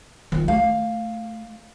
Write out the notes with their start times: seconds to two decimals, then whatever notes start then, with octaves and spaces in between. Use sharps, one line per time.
0.32 D#3 F3
0.48 A3 F5